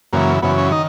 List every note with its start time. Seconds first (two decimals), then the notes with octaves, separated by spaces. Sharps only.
0.13 F#2 C#3 E3 A#3
0.42 F#2 C#3 E3 B3
0.58 C#4
0.72 D#3 D#4